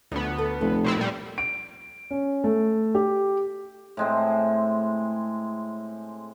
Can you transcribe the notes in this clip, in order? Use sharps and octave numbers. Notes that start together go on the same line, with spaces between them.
D2 F3 A3 B3 D4
A4
F1 A4
B2 C4 E4
A#2 G3
D7
C#4
A3
G4
A2 G#3 C4